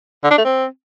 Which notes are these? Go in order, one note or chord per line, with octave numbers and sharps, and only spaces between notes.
D3
D4
A3
C4